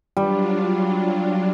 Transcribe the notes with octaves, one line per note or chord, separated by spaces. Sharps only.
F#3 G3 D4 F4